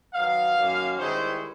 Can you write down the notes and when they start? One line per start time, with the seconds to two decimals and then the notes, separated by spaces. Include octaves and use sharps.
0.14 D#3 F#3 B3 F5
0.57 F#2 D#3 F#3 A#3
0.99 G2 D#3 G#3 C#4 E4 C5